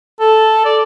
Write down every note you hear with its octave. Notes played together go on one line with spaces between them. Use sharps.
A4
D5